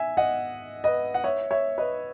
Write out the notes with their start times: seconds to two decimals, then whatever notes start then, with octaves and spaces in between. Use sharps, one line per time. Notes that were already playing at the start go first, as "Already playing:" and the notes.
Already playing: E5 G#5
0.17 D#5 F#5
0.84 B4 D#5
1.14 F#5
1.24 C#5 E5
1.51 C#5 E5
1.78 B4 D#5